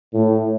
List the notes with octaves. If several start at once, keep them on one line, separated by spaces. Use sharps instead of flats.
A2